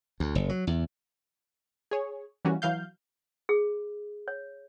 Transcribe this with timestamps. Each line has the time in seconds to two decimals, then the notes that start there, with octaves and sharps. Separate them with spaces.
0.20 D2
0.35 F#1
0.49 F#3
0.67 E2
1.91 G#4 C#5
2.45 E3 G3 A#3 C#4 F#4
2.62 E3 F#3 F5 G6
3.49 G#4
4.28 C#5